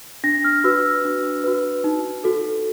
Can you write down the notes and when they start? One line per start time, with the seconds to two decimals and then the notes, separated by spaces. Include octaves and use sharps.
0.24 D4 A#6
0.44 F6
0.64 F#4 B4 E6
1.05 D4
1.44 F#4 B4
1.84 D#4
2.24 F#4 A4